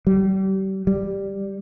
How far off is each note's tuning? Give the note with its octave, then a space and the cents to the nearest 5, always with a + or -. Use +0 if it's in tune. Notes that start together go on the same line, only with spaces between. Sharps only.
G3 -35
G3 +5